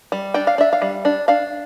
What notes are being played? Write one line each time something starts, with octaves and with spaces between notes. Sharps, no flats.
G3
D4 G5
F5
D4 E5
F5
G3
D4
D4 F5